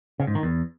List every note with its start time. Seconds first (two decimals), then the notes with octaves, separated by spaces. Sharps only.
0.20 C#3
0.27 G#2
0.35 D#3
0.43 E2